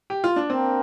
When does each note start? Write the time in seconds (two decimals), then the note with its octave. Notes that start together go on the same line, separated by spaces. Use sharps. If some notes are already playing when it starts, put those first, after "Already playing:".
0.10 G4
0.24 F4
0.36 D4
0.50 A#3 C4 D4 A#4 G5